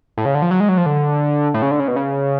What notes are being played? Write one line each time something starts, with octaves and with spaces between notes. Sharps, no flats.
A2
C#3
D3
F3
F#3
G#3
F#3
F3
D3
A2
C#3
D3
C#3
B2
C#3